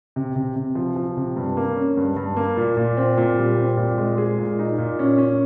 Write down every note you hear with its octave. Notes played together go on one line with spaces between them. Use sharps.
C3
C3
C3
F3
F3
C3
G2
A#3
C#4
G2
G2
A#3
A#2
A#2
C4
A#2
G3
C4
A#2
G#3
G#4
A#2
D#4
A#2
C#4
C#4